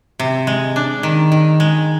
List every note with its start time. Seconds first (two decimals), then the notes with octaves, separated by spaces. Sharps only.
0.19 C3
0.47 G#3
0.76 D4
1.03 D#3
1.32 D#3
1.60 G#3